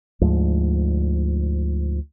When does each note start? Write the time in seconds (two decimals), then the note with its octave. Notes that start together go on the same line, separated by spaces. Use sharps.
0.21 D2 G#2 F3 G#3